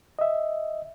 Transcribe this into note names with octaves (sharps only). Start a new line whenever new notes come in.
D#5 E5